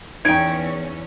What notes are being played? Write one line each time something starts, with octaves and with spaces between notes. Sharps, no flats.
E2 C#4 D#4 G5 G#6 D7